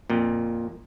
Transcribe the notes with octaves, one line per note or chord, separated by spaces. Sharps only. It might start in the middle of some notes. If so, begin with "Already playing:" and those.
F2 A#2